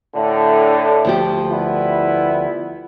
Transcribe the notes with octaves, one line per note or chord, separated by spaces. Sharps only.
A2 D3
D2 F3 G4
G3 B3 E4